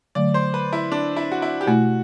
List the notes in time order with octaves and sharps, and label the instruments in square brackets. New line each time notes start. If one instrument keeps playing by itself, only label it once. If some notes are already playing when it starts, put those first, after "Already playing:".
[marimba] D3 F#3 A3 [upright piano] D5
[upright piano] C5
B4
E4
D4
E4
F#4
E4
G4
[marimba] B2 A3 E4 [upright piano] F#4